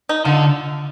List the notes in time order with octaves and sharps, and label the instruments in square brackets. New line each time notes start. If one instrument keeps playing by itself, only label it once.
[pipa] D#4
[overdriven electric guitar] D3 [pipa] F4